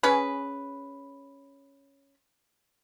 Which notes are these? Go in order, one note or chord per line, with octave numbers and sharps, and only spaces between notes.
C#4 G#4 B4